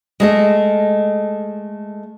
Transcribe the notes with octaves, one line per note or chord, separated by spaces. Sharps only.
G#3 A3 D#5